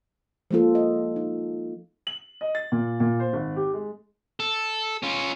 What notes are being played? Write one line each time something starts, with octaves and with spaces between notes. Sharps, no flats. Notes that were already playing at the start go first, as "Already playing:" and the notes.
F3 G#3 A#3 F4 A4
D#5
D#4
F#7
D#5
A6
A#2
A#2
C5
G#1
G4
G#3
A4
C#4 F4